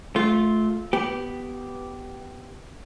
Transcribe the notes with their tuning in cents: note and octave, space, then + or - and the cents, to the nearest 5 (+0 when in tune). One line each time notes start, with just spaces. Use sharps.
A3 -20 F4 +0
B3 +0 G4 -10